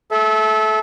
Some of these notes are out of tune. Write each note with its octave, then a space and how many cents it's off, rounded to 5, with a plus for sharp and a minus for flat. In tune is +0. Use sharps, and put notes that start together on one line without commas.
A4 -30 E5 -5